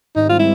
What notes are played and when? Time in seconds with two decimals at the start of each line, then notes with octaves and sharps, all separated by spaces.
0.16 G#2 D#3 G3 C4 D#4
0.30 F4
0.39 E4